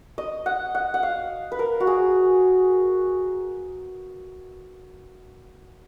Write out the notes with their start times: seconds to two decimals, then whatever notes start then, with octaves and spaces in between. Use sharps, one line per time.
0.18 D#5
0.46 F#5
0.75 F#5
0.94 F#5
1.03 F5
1.52 B4
1.59 A#4
1.80 F#4
1.87 G#4